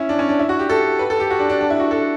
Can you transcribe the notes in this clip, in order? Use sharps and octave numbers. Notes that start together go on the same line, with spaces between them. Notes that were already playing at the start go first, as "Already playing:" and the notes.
Already playing: C#4 E4
D4
C#4
D4
E4
F#4
G4
A4
B4
A4
G4
F#4
D4
D4
D4
E4
F#4
A4